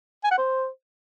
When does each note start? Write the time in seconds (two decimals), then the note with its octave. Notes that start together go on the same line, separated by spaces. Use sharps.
0.24 G#5
0.31 F#5
0.39 C5